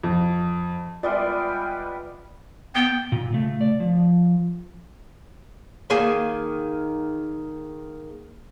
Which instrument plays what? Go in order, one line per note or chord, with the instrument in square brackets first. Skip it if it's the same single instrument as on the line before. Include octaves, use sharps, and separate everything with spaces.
[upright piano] F2
[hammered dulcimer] G3 G#3 B3 [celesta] F4 E5 [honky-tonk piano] D5 [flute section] G5 F6
[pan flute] B3 [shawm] G5
[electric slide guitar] A#2
C#3 A3
D5
F3
[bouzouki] D#3 A#3 G#4 G#5